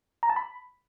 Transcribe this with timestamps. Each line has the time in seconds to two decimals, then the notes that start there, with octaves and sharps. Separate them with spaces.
0.23 A#5
0.30 A5
0.36 B5